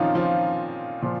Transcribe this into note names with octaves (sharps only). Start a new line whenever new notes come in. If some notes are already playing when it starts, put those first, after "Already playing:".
Already playing: A#2 D#3 F3 C4 C#4 D#4 F4
F3 F4
A#2 F3 F4